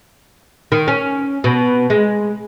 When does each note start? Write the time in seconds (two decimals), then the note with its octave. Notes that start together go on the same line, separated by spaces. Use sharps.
0.72 D#3
0.88 C#4
1.44 B2
1.90 G#3